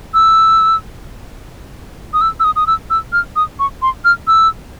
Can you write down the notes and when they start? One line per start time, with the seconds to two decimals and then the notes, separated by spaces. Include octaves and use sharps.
0.14 E6
2.14 D#6
2.21 E6
2.40 E6
2.44 D#6
2.56 D#6
2.67 E6
2.90 E6
3.13 F6
3.36 D#6
3.59 C#6
3.82 C6
4.05 F6
4.27 E6